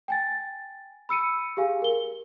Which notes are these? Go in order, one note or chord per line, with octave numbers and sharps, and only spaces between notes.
G5 G#5 A6
B5 E6 C#7 D#7
G4 G#4 F5 G#5
A#4 G7